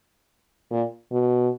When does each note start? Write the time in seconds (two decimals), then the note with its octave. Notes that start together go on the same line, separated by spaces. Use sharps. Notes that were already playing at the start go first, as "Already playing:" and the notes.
0.71 A#2
1.12 B2